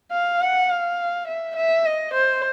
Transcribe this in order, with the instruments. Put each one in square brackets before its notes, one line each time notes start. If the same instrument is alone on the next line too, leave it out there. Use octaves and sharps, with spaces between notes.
[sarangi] F5
F#5
F5
E5
E5
D#5
C5